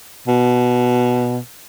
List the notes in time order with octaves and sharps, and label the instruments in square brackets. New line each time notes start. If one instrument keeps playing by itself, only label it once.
[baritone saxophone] B2